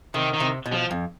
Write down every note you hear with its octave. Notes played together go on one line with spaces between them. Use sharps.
C3 D#3
D#3
C3
B2
F3
F2